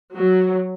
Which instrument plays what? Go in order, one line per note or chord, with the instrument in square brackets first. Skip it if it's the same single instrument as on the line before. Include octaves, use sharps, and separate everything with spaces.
[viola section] F#3